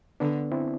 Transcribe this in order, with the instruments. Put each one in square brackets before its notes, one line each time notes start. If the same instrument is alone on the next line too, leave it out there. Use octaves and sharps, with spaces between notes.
[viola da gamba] D3 [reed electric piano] B3 D4
[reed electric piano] C4 E4